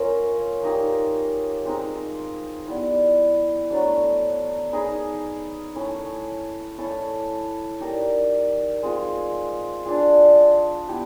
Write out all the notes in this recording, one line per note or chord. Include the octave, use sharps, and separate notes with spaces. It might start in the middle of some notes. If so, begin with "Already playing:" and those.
Already playing: C#4 F4 A#4 D#5
A#3 D#4 G4
G#3 C4 D#4
G3 B3 E4
F#3 A3 D4
D#4 G#4 B4
A3 C#4 E4
A3 C#4 E4 A4
D#4 G4 A#4 D5
G#3 C4 F4
D4 F4 G#4
B3 E4 G4